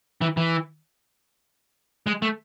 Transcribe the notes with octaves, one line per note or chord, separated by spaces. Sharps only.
E3
E3
G#3
A3